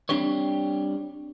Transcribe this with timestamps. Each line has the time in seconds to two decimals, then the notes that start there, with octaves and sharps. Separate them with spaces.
0.09 G3 C4 D4 G4 C5 C#5